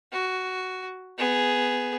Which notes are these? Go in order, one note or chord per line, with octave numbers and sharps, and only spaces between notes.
F#4
B3 G#4